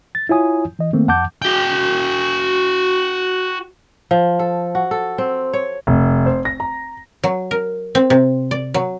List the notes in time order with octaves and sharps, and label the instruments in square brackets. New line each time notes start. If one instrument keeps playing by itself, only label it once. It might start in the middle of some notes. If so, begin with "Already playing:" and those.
[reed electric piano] A6
E4 F4 C#5 G#5 D#6
E3 D#5
D#3 A3 A#3 C4
F2 F#5 A5 D6 G6
[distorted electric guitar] F#4 G5
[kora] F3
A4
F#4
A4
C4
C#5
[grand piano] F1
C5
A#6
A#5
[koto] F#3
A#4
C4
C3
D5
F#3